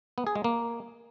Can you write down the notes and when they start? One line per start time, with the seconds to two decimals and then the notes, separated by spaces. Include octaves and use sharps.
0.18 B3
0.27 G#4
0.35 G#3
0.44 A#3